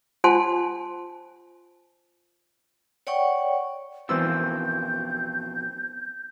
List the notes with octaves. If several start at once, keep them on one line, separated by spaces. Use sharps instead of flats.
F4 C5 F#5 G#5 A5 C6
C#5 D5 F#5 G5 C#6
F2 B2 D#3 E3 C4 E6 G6